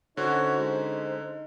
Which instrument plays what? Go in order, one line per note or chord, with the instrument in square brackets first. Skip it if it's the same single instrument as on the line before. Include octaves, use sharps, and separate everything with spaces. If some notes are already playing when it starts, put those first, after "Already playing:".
[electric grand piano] D3 C#4 [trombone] D#4 [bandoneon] F#4 C#5 [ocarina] C5
[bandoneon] G#3